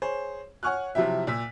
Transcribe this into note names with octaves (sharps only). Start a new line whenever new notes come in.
G#4 C5 C#5
C#5 F#5 G#5 C#6 F6 F#6
C3 F3 F#3 E4 G4 E5
A#2 E6 B6